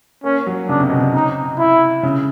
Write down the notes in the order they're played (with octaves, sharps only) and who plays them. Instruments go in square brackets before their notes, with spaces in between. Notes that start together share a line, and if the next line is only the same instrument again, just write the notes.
[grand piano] A#3 [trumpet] C#4
[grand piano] F#3
[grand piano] C#3 [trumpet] D4
[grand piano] C3
B2
C3
[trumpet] D#4
E4
[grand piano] C#3